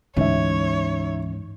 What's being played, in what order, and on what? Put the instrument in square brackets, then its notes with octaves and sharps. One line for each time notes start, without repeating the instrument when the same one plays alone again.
[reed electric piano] D2 E3 C#4 [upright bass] G#2 [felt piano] D#4 E5 [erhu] C#5